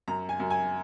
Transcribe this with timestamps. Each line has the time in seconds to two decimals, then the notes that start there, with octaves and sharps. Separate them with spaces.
0.08 F#2 A#5
0.29 G#5
0.40 F#2
0.50 G#5